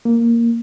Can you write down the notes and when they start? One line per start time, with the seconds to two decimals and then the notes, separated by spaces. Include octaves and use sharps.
0.05 A#3